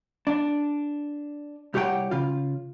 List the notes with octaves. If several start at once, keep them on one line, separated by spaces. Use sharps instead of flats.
D4
C2 G4 C#5 F#5 G5
C#3 F4